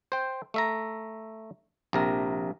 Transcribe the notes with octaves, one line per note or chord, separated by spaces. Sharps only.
C5 G5
A3 E5 A#5
A#1 C3 A#4